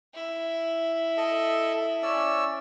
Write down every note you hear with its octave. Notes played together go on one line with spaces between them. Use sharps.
E4
A4 D#5
C#4 D5 E6